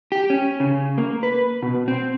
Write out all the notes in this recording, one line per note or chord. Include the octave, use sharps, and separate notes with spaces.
G4
C#4
C#3
A#3
B4
B2
C4